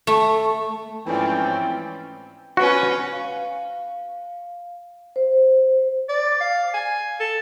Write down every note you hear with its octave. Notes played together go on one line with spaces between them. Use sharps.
A3
G#2 E3 F3 A3 C4 C#4 D5 G5
C#4 F#4 B4
F5
C5
D5
F5
G#5
A4